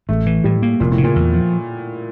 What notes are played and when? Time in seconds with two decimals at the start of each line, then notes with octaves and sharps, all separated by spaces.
0.09 A1 A3
0.26 E3
0.44 A2 G3
0.62 A#3
0.80 F1 A#2
0.92 A2
0.98 C#3
1.04 A#2
1.16 E2
1.33 F3